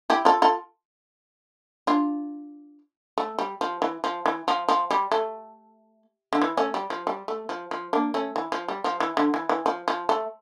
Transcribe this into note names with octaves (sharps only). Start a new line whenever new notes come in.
E4 G4
F4 A4
F4 A4
D4 F4
A3
G3
F3
E3
F3
E3
F3
F3
G3
A3
D3
E3
A3 C#4
G3
F3
G3
A3
F3
F3
A#3 D4
A3 C#4
E3
F3
G3
F3
E3
D3
E3
E3
F3
F3
A3